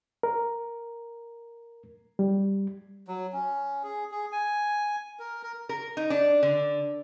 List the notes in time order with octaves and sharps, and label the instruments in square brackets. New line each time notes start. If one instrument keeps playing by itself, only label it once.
[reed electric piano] A#4
G3
[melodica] F#3
C#4
G#4
G#4
G#5
A#4
A#4
[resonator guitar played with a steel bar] A#4
D#4
D4
D3